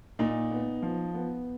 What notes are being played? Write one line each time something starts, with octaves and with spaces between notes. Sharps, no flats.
A#2 D#4
B3
F3
B3